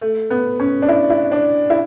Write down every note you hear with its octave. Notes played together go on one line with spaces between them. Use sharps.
A3
B3
C#4
D4
E4
E4
D4
E4